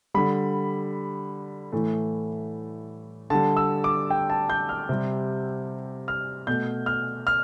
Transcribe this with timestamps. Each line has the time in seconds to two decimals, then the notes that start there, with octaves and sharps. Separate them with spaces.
0.14 D3 G3 B5
1.72 A2 E3 A3
3.30 D3 G3 A5
3.57 E6
3.84 D6
4.11 G5
4.30 A5
4.50 G6
4.69 F6
4.89 C3 G3
6.08 F6
6.47 B2 A3 G6
6.86 F6
7.27 F6